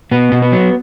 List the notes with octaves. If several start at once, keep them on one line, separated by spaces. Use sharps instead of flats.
B2 B3
B2
B3
F#3